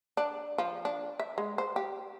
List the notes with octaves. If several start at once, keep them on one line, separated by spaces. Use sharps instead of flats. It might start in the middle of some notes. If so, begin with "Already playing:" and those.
D4
F3
D4
E5
G#3
C5
G4